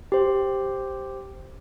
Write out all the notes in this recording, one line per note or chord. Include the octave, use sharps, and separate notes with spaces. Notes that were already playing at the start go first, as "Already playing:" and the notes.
G4 C5